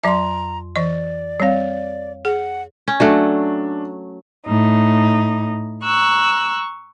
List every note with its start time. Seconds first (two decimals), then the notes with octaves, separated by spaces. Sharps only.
0.04 F2 F#3 E5 A#5 C6
0.76 E3 D5 D#5
1.40 G3 C4 C#5 F5
2.25 G#4 F#5
2.88 C#4
3.00 F#3 A3 D4 F#5
4.47 A2 D#4
5.83 A#5 C#6 E6 F#6